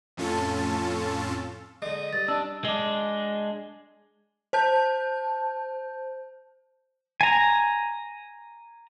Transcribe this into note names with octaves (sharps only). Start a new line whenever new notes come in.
F2 A2 C#4 F4 A4 A5
D3 G#3 D#5
G2 A6
D4 E6
G#3 D4
C5 A5 G6
G#5 A#5